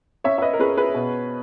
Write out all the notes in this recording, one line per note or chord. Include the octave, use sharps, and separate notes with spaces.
C#4 C#5 E5
E5
B4 D#5
A#4
C#4 G#4 B4
G#4 B4
B2